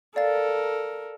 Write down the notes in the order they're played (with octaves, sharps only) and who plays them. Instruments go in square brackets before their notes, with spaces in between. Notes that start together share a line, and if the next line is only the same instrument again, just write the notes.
[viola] A4 A#4 [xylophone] D5 F5 A6